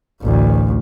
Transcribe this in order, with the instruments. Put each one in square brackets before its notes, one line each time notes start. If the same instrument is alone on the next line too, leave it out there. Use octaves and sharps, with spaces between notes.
[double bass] A1 D2